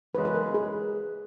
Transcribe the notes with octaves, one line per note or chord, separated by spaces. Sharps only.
F#2 C#3 E3 G#3 B4
B4
A#4
G#4